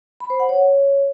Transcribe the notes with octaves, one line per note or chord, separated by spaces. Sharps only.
B5
C5
F#5
C#5